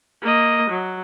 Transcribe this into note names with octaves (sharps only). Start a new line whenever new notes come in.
A#3 D#5
F#3